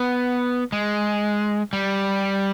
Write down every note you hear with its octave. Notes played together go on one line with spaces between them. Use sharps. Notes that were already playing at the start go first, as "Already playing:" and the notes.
Already playing: B3
G#3
G3